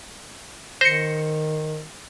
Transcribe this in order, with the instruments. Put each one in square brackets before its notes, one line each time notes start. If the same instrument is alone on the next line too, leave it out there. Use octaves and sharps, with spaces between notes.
[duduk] D#3 [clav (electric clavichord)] C5 [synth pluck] A#6 C#7